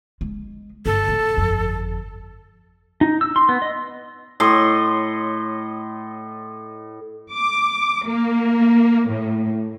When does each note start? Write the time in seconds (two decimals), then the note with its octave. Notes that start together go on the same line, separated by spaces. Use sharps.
0.21 G#3
0.86 G1 A4
1.08 A2 C#3
1.36 G1 F2
3.01 D#4
3.21 E6
3.36 C6
3.49 B3
3.62 D#5
4.40 A2 D#5 C6
7.32 D6
8.08 A#3
9.10 A2